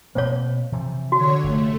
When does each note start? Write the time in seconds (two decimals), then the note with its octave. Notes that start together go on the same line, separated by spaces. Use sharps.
0.15 B2 A#3 C4 C5 C#5
0.72 C3 E3 F3
1.12 D3 F#4 C#5
1.44 F1 A3